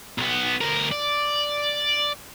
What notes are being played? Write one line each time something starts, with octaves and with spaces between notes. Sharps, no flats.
B1 B3
D2 A#4
D5